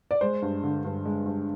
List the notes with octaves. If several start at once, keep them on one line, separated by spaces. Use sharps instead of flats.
D5
G#3 C5
G2
D3
G2
G#3
G2